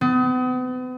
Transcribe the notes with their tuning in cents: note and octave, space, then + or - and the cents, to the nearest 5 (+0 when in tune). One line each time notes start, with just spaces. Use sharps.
B3 +40